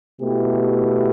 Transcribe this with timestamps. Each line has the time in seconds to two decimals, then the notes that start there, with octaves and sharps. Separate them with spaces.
0.19 B2 A3 E4 G4